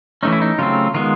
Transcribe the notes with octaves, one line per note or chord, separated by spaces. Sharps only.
E3 A3 C#4 D#4
E4
D#4
C#3 F#3 A3 C4 F4
D#3 G#3 B3 F4